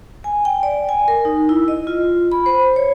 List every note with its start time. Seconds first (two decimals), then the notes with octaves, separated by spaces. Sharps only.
0.24 G#5
0.45 G5
0.63 D5
0.89 G#5
1.08 A#4
1.25 D#4
1.49 E4
1.68 D#5
1.87 F4
2.32 B5
2.46 C5
2.76 C#5